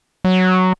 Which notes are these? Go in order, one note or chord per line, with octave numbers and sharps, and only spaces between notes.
F#3